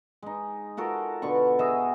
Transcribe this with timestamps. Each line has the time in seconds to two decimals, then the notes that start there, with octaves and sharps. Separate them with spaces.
0.22 G#3 D#4
0.77 F4 F#4 A4 A#4
1.22 B2 D3 D5 C#6
1.59 F#4 G#4 D#5 E5